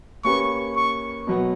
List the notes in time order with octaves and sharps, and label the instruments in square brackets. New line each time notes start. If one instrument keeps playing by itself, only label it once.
[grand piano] A#3 C#4 G4 B4 [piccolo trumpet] C#6
[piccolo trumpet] C#6
[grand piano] B2 F#3 B3